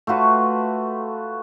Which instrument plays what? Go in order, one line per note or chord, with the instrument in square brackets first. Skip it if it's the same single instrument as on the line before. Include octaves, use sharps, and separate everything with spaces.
[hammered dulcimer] A3 F4 F#4 B4